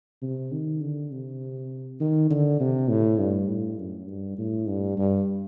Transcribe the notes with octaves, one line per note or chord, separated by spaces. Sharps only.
C3
D#3
D3
C3
D#3
D3
C3
A2
G2
A2
F#2
G2
A2
G2
G2